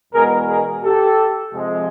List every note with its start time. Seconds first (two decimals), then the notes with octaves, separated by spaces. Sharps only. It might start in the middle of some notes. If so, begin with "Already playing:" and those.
0.13 E2 B2 G#3 G#4 A#4
0.48 G#4 A#4
0.82 G4 A4
1.52 F2 C3 F3 G#3